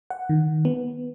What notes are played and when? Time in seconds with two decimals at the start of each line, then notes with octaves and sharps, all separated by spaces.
0.10 F#5
0.29 D#3
0.65 B3